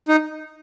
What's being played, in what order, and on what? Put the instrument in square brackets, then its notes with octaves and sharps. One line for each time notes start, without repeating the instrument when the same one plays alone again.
[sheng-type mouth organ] D#4